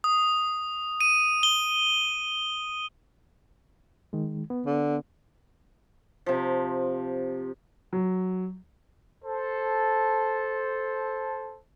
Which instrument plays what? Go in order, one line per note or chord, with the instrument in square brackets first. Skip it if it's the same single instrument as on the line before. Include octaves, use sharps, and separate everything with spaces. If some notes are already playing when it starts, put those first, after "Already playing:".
[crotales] D#6
D#7
G7
[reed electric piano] D#3 G#3
B3
[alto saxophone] D3
[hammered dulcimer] C3 F3
[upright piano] F#3
[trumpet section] A4 C5